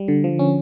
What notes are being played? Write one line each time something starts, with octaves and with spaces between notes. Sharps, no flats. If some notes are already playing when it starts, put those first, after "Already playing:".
Already playing: G3
D3
F3
C#4